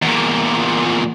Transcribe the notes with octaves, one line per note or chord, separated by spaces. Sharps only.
E2 A#2